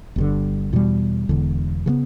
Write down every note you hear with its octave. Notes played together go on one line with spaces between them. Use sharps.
G1 G2 D3
E2 B2 G3
E1 E2 D3
C#3 E3 B3